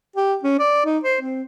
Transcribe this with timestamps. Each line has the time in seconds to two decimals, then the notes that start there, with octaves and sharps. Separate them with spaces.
0.16 G4
0.43 C#4
0.59 D5
0.86 D#4
1.04 C5
1.21 C4